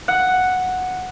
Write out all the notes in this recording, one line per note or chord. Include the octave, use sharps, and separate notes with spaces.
F#5